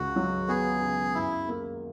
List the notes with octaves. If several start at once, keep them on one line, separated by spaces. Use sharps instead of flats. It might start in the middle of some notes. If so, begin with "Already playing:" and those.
Already playing: C#2 F#4
F#3
B3 G#4
C#3
F#2 E4
A#3